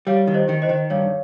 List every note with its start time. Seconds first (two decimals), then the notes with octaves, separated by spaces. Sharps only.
0.07 G3 C#5 F5
0.27 D#3
0.34 C5 D#5
0.49 D#3
0.62 C5 D#5
0.69 D#3
0.90 G2 C#5 F5